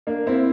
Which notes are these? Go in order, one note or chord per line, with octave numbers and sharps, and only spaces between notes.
A#3 D4
C4 E4